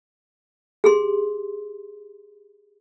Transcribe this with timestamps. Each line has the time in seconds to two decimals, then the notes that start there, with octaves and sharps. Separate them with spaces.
0.84 G4 G#4 C6